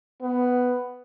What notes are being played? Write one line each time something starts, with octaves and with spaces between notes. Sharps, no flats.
B3